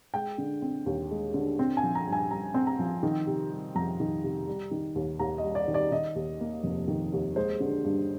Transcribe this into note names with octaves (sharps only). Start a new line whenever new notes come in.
G#3 G5
D3
C4
D#2
G#3
D3
C4
G#5
F3
A#5
G2
G#5
G2 A#5
C4
A#5
F3
D#3
C3
G3
F2 A#5
D#3
C3
G3
D#3
D#2
D#2 A#5
G3 D#5
D5
D#3
D5
D#3 D#5
D#2
A#3
F1
D#3
D#2
G#3 C5
D3
G2